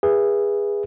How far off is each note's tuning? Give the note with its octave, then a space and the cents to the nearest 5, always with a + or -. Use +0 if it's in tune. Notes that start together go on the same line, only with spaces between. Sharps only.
G#4 -20 B4 -15 E5 +25